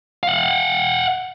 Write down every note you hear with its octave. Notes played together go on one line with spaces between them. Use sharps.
F5 F#5